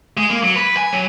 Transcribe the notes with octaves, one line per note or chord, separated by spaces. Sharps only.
G#3
A#3
F#3
B4
G#5
F#3